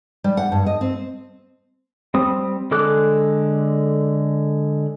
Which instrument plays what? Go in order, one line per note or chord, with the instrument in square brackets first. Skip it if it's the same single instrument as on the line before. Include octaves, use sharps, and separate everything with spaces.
[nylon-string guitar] G3
F#5
G2
D#5
C4
[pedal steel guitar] G3 C4 D#6
D3 G#3 A4 D6 F#6